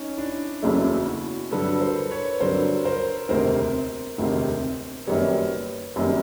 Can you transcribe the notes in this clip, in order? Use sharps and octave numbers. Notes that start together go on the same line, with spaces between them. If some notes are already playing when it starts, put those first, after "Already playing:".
Already playing: C#4 D#4
D4 E4
F#1 E2 C#3 F#3 A3 D4 E4
E4 F#4
G2 D3 F#3 A4 B4
A#4 C5
B4 C#5
G2 D3 F#3 A#4 C5
A#4 C5
E1 D2 C3 D#3 A#4 C5
E1 D2 C3 D#3
F#1 F#2 D#3 G3 B4 C#5
F#1 F#2 D#3 G3